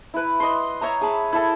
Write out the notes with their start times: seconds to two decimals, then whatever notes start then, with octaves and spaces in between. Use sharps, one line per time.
0.14 E4 B4
0.40 D#5 C6
0.81 C#5 E5 A#5
1.01 G#4 A5 B5
1.33 E4 A4